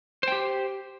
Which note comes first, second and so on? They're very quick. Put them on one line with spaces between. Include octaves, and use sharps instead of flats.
C5 G5 G4